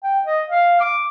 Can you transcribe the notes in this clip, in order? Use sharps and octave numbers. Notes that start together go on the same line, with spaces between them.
G5
D#5
F5
D6